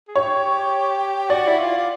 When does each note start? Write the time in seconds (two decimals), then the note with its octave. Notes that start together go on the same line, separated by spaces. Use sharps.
0.08 G#4
0.16 G4 C#5
1.30 F#4 D5
1.48 E4
1.60 F4
1.78 F4